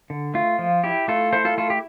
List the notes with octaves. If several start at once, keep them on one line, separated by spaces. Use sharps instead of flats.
D3
A3 F4
F3
E4 G4
A3 F4 A4
E4 A4 C5
F4 A4
A3 F4 A4
G4